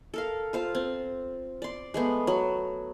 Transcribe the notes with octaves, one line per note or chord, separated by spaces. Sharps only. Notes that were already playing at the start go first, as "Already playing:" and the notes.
A4 A#4 F5
F4 C5 F5
C4
D5 C6
G#3 A3 B3
F#3